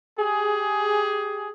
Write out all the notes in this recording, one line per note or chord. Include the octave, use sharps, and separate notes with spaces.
G4 G#4